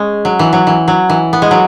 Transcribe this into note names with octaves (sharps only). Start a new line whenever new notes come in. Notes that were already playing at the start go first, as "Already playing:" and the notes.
Already playing: G#3 C#4
F#3
E3
F#3
E3
F#3
E3
B3
G#3
F#3